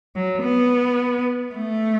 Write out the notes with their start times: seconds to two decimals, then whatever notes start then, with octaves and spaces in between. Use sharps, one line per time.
0.16 F#3
0.43 B3
1.55 A3